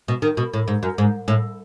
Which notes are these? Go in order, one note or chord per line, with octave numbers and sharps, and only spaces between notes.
B2
D#3
B2
A2
G#2
F#2
G#2
A2